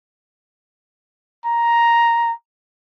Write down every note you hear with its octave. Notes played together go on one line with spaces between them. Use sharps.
A#5